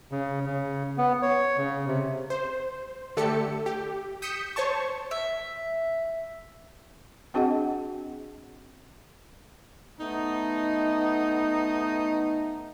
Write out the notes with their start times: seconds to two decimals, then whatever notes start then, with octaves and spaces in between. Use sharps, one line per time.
0.12 C#3
0.45 C#3
0.98 B3
1.22 C#5
1.58 C#3
1.87 C3
2.30 C5
3.17 D3 A3 G4 A4 C#7
3.66 G4
4.22 D#6 G6 B6 C#7 E7
4.56 C5 C#5 A5 C#6
5.11 E5
7.34 C4 D4 F#4 G#4 D#5 F#5
9.99 A3 B3 D#4